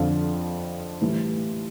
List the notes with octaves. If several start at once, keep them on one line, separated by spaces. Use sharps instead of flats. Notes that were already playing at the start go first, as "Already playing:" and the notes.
Already playing: F2 D3 F3 F4
A2 E3 G3